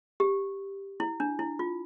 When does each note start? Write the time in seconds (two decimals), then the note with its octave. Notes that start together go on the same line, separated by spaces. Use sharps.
0.20 G4
1.00 E4
1.20 D4
1.39 E4
1.59 F4